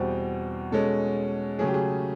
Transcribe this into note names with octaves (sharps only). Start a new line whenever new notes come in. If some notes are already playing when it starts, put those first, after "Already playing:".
Already playing: E2 B2 G3 C4 C5
B2 G#3 C#4 A4
C#3 F#3 A3 C#4 G#4
G4
G#4